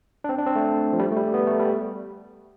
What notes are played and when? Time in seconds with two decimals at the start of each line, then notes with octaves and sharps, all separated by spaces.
0.24 D4
0.29 C4
0.38 D4
0.46 C4
0.56 A3
0.93 F3
0.99 G3
1.12 A3
1.17 G3
1.34 B3
1.47 A3
1.59 G3